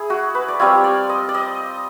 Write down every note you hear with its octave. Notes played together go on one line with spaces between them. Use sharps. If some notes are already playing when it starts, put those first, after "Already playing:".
Already playing: E4 G#4
F#4
B4
D5
G3 C4 F4 C#5
D5
D#5
D5
D#5